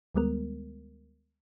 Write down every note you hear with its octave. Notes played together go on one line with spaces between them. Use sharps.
D2 D#3 G3 G#3 B3 A#4